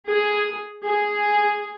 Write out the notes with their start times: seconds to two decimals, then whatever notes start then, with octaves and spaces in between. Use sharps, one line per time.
0.10 G#4
0.83 G#4